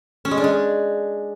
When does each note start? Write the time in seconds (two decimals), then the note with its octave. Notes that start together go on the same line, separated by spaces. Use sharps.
0.25 C#4
0.31 G#3
0.38 D4
0.44 G#3